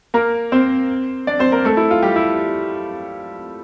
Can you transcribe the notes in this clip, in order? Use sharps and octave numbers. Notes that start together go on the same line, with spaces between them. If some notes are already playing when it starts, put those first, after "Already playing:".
A#3 A#4
C4 C5
D4 D5
C4 C5
A#3 A#4
A3 A4
E4
F4
G3 G4
E4